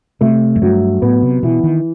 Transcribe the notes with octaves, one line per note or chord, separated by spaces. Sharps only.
C3 A3
F#2
G2 F#3
A2 B3
C3
B2 E3
D#3